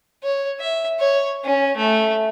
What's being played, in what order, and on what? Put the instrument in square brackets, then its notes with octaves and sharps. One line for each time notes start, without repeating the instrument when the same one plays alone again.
[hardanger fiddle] C#5
E5
C#5
C#4
A3